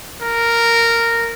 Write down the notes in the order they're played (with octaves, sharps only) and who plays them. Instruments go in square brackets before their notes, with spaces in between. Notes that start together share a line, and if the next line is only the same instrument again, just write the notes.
[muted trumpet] A#4